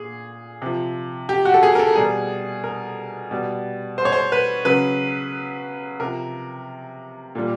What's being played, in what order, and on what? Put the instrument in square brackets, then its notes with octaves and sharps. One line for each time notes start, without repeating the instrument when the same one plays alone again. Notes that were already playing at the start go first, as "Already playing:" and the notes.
Already playing: [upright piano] A#2 G#4
C3 F3
G4
F#4
A4
G#4
A#4
A4
B2 G3 G#4
A#4
B2 G3
C5
C#5
C5
B4
C#3 F#3 B4
C3 F3 A#4
A#2 G3